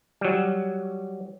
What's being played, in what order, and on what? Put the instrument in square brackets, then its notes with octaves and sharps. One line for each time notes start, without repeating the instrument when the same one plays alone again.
[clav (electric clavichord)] F#3 G3